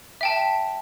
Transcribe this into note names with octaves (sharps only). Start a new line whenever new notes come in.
E5 G5 A5